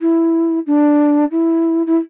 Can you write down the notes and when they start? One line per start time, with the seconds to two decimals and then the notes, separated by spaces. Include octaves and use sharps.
0.01 E4
0.66 D4
1.31 E4
1.86 E4